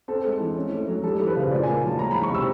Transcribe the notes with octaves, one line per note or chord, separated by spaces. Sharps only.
C4 A4
G#3
E3
C#4
A3
F#3
G3 A4
E3
B4
C#3 C5
A#2 D5
A#3 G#5
F#3 A5
G#3 A#5
E3 B5
C#6
C3 E6